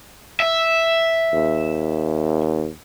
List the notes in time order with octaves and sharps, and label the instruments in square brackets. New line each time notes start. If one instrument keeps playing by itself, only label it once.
[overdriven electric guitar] E5
[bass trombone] D#2